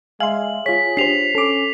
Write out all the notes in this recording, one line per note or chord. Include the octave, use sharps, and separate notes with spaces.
G#3 E5 F5 G#5 C6 F#7
F4 G#4 C#5 B6
D4 G4 C5 C7 F7
C#4 A4 D6